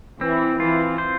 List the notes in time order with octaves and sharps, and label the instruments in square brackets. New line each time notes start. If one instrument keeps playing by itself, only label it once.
[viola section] E3 [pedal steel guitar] C4
[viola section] E3 [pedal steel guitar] F4
[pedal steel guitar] C5